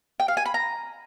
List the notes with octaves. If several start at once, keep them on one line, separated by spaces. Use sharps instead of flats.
G5
F5
G#5
B5
A#5